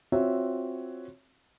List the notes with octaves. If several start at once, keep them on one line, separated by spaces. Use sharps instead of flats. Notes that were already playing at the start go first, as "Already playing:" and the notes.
C4 F4 F#4 C#5 E5